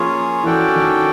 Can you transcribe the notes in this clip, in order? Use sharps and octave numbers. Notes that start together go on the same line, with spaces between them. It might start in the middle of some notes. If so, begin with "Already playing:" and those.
Already playing: F3 A#3 C#4 F4 G#4 C#5
E3 C#4 F#4 A4 D5 G5
D#3